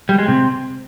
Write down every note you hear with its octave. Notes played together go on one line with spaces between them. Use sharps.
G3
G#3
C3